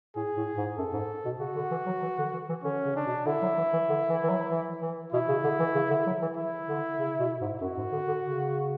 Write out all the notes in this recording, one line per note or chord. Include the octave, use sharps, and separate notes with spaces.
A2 G#4
A2
G#2
F#2 A4
G#2
B2
C#3 F#4
D3
E3
F#3
E3
D3
E3
E3
D3 C#4
C#3
D4
B2
D3 E4
F#3
E3
E3
D3
E3
E3
F#3
E3
E3
B2 E4
C#3
D3
E3
C#3
D3
F#3
E3
E4
D3
C#3
B2
G#2
F#2 F#4
G#2
D3
D3
C#3